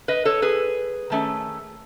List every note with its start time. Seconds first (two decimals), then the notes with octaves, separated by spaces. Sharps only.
0.08 B4 D#5
0.25 A4 C#5
0.42 G#4 B4
1.10 D#3 A3 C#4